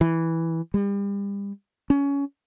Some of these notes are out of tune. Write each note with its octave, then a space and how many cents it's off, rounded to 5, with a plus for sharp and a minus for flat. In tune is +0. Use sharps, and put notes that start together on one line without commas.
E3 -5
G3 +35
C#4 +20